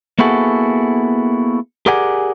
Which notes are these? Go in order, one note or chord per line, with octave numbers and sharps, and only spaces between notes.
A#3 B3 E4 F#4 G#4 A4
G4 G#4 A#4 D5 F#5 G#5